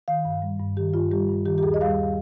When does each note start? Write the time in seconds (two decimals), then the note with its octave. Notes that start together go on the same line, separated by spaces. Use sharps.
0.08 D#3 F5
0.25 G2
0.42 G3
0.59 G2
0.77 D#3 G4
0.94 G2 F4
1.11 G3 G4
1.29 G2
1.46 D#3 G4
1.58 G4
1.63 D#2 G#4
1.74 D#5
1.81 G3 F5